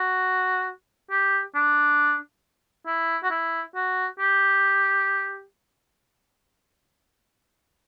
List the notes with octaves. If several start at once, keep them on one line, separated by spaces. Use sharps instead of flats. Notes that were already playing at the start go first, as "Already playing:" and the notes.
Already playing: F#4
G4
D4
E4
F#4
E4
F#4
G4